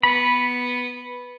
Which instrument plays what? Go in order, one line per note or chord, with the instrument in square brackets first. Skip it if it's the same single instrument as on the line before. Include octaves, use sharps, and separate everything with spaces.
[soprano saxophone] B3 [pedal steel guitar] B5